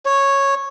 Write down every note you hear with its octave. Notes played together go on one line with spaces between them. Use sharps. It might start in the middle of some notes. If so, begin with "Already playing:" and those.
C#5